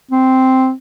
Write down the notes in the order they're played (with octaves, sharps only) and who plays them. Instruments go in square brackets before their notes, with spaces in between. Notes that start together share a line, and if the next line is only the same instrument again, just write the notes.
[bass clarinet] C4